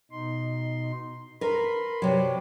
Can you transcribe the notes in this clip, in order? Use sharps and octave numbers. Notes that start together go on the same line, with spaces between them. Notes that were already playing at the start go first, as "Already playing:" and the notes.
B2 D#4 C6
A#4 B4 B5 C6
C3 F#3 B4 D5